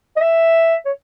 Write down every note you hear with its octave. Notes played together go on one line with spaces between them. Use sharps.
D#5
E5
C#5